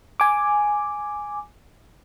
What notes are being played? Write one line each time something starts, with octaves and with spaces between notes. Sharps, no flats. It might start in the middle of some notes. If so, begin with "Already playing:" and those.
G#5 D6